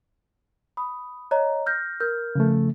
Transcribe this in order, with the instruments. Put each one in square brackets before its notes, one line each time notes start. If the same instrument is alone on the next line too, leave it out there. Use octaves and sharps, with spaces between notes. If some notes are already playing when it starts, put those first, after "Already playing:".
[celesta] B5 D#6
C#5 D#5 A#5
F6 G6 A#6
A#4 F6 G6
[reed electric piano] C#3 F3 A3